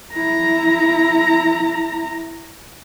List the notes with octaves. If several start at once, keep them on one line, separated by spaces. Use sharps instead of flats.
E4 A#5